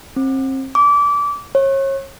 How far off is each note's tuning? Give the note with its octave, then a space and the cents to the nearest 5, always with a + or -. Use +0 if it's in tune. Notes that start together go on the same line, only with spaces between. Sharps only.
C4 +30
D6 -25
C#5 -35